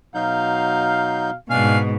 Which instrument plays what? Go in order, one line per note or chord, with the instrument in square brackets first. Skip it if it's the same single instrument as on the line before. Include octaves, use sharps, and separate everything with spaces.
[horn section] B2 F5 [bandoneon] F#3 D#4 G6
[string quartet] G#2 B2 [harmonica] D4 F5 G#5